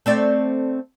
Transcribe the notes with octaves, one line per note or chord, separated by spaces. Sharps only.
A3 C4 D5